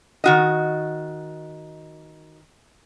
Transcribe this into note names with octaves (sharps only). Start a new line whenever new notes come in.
D#3 F#4 D#5